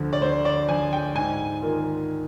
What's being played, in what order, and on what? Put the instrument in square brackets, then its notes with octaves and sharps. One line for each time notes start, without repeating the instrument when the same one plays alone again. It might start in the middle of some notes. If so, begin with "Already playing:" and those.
Already playing: [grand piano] D2 D3 F3
[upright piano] D5
[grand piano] D2 [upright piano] C5
[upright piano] D5
[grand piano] D3 F3 [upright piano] G#5
[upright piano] G5
[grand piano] G#2 [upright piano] G#5
[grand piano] D#3 A#3 F4 A#4